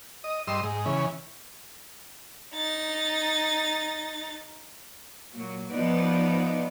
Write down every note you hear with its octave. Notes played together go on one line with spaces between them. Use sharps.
D#5
G2 D#5 C6 E6
G#2
C#3 E3
D#4 A6
A#2 F#3 A#3
F3 B3 D#4 B4 D5